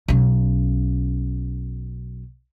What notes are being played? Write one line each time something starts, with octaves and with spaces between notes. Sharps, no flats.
B1 C#4